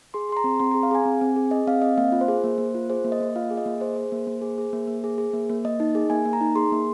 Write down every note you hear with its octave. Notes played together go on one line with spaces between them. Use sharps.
G#4 C6
G#4 C6
A#5
C4
C4 C6
G#4 A#5
F5
G#4 G#5
C4
C4
G#4
G#4 D#5
C4 F5
C4 D#5
A#3 F5
F4
C5
G#4
A#3
A#3
F4
G#4 C5
A#3
D#5
A#3
F4 F5
G#4
D#5
A#3
G#4 C5
G#4
A#3
A#3
G#4
G#4
A#3
A#3
G#4
G#4
A#3
A#3
A#3 D#5
D#4
G#4
A#3 G#5
A#3
A#5
D#4
G#4 C6
A#3